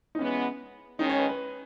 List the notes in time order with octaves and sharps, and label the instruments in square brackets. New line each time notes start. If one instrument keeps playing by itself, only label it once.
[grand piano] D#4
[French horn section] E3 G#3 B3 [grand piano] C#4
[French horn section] D#3 G#3 C#4 [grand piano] D#4
[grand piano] C#5
B4
B4